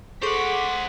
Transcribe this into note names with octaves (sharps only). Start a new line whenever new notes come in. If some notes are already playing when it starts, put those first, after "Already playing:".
G#4 A4 C5 F#5 C#6 D6 B6